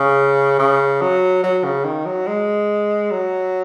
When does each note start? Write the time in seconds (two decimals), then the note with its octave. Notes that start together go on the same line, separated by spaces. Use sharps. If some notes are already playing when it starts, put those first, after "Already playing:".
Already playing: C#3
0.58 C#3
1.01 F#3
1.43 F#3
1.64 C#3
1.84 D#3
2.05 F#3
2.27 G#3
3.11 F#3